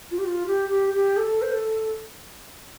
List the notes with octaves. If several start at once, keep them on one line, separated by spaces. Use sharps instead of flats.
F4
G4
F4
G4
G4
G4
A4
C5
A4